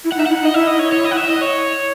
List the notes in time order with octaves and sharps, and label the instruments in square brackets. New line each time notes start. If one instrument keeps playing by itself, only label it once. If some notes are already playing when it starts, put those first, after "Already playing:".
[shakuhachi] E4
[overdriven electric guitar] F#5
[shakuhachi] D#4 [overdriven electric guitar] E5
[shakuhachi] E4 [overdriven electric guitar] F#5
[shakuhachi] D#4
[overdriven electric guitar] D#5
[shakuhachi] E4 [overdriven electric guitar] E5
[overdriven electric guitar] D#5
C#5
C#5
D#5
F#5
E5
D#5
C#5